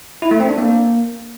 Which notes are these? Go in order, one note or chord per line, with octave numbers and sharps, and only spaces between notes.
E4
A3
C4
D4
A#3